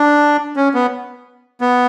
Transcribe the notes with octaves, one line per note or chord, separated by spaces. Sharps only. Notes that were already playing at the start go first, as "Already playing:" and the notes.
Already playing: D4
C#4
B3
B3